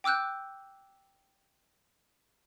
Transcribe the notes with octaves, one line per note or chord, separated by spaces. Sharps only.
G5 D6 E6 F#6 G6